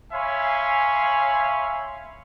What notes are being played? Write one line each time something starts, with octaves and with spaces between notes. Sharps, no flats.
C#5 E5 F5 G#5 B5 C6